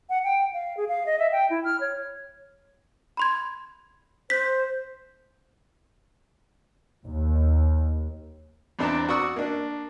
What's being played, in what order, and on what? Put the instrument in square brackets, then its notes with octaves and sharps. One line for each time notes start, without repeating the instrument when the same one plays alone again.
[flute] F#5
G5
F5
G#4
F5
D#5
E5
G5
E4
F6
C#5
[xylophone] B5 C6 G#6
[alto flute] C5 [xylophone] F#6 G6 B6
[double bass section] D#2
[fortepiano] E2 C4 D4 D5 A5 A#5
F#4 D5 F#5 C#6 D#6 E6
A#3 D4